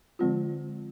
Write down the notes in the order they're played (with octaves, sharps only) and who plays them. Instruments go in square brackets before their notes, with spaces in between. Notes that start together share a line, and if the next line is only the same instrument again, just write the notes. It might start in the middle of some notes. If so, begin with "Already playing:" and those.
[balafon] D3 F3 G#3 C4 F4